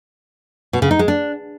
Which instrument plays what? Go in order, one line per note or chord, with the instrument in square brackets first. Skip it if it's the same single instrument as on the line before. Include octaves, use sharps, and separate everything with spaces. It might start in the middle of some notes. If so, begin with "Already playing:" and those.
[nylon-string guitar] B2
C#3
D#4
G#3
D4